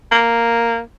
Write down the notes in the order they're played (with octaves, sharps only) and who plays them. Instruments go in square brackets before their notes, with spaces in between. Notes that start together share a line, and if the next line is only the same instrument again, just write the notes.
[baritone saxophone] A#3